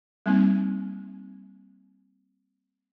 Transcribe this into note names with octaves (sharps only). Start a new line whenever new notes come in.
G3 A#3 C4 D#4